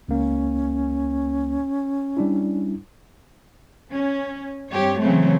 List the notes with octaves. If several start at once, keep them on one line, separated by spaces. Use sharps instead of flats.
C#2 A#3 C#4
G3 D4 E4
C#4
G2 C4 G4 C#5
C#3 E3 F#3 A3 C4